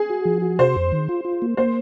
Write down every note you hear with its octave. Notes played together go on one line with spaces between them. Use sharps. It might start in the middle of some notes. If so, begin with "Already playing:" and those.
Already playing: G#4
F#4
F3
F#4
C3 C5
F2
D#3
F4
F4
A#3
A#3 C5